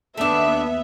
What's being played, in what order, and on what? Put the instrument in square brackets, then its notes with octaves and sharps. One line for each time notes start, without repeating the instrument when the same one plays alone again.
[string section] D#2 B3 E5 [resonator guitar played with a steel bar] A3 D4